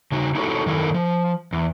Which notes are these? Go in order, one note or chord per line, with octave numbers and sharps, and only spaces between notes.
C#3 D#4 F#4
D#4 E4 F#4 G4 A4 C#5
F#2 D#3 E4 A4 A#4
F3
E2